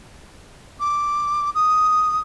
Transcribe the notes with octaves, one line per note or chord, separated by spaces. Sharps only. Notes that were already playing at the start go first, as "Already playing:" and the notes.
D6
D#6